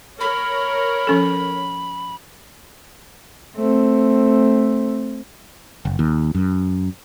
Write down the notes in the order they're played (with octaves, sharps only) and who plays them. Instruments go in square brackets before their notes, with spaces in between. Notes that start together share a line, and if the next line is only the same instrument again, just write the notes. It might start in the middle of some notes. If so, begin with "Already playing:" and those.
[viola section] A#4 C#5 [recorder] B5
[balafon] F3 C#4 A4
[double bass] A3 C4
[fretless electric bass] F#1
D#2
F#2